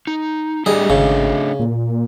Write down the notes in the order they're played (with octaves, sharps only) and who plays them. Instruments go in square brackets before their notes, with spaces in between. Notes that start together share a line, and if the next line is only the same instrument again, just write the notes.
[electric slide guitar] D#4
[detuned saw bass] G3 [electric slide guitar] A3 D4 D#5 [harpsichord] G#4
[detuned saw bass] G#1 [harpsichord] C#3
[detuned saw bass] A#2